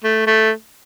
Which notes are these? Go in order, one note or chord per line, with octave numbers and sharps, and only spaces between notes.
A3
A3